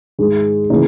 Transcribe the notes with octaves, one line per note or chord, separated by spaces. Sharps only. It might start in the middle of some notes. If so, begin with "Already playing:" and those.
G#2 D#3 G#3
C#3 E3 A#3 D#4 G#4